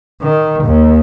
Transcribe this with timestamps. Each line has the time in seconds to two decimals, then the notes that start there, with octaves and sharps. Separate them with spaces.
0.22 D#3
0.64 D#2